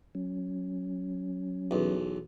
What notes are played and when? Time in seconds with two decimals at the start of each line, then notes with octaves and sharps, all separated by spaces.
0.15 F#3 C#4
1.71 B1 E2